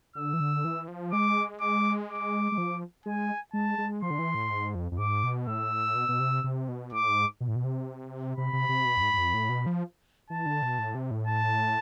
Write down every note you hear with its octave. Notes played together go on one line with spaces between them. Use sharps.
D3 E6
E3
D3
E3
F3
G#3 D6
D6
D6
G#3
F3
G#3 G#5
G#3 A5
G#3
F3 C6
D3
E3
A2
G#2
F2
F2
G#2 D6
B2
A2 E6
B2
B2
C3
C3
B2
A2 D6
G#2
B2
A2
B2
C3
C3 B5
C3
C3
B2
F2
G#2
G#2
F2
A2
B2
F3
E3 A5
D3
B2
A2
C3
A2
A5